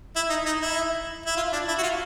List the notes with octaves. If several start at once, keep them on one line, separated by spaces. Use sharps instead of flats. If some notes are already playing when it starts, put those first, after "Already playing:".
E4
D#4
D#4
E4
E4
F4
D4
E4
F#4
F4